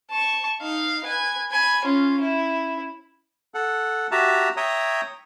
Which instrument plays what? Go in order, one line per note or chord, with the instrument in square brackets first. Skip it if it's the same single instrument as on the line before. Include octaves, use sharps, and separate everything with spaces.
[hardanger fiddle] A5 C#6
D#4 F5
B4 G#5
G#5 B5
C#4 F4
E4
[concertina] A4 F#5
F#4 G4 E5 A5 A#5
C#5 E5 G5 A#5 D#6